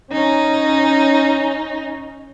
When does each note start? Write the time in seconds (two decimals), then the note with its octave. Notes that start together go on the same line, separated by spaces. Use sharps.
0.12 C#4 D#4